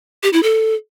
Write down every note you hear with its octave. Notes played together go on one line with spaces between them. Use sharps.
G4
E4
A4